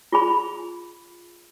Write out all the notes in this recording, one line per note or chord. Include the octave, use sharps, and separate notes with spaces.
F4 G#4 B5